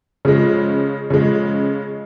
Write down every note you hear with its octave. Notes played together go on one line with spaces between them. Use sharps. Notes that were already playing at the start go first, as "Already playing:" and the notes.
C#3 F3 G#3
C#3 F3 G#3